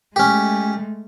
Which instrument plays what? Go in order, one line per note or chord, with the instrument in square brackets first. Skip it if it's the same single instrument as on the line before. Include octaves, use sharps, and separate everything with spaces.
[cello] G#3 A3 [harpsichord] C#4 G4